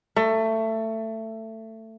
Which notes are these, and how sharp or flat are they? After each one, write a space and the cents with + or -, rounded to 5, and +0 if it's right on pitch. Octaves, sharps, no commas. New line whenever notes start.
A3 +20